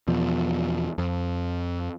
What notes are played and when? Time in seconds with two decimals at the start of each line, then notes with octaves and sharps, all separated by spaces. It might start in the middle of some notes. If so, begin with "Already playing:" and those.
0.08 E2 B2 F3
0.98 F2